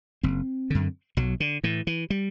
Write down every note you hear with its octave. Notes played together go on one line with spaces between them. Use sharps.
F#1 C4
F#2 D3
B1 F#3
D3
A2 E3
E3
G3